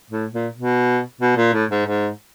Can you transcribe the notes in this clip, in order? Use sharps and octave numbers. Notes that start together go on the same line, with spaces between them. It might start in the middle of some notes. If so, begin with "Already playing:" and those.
A2
A#2
B2
B2
A#2
A2
G#2
G#2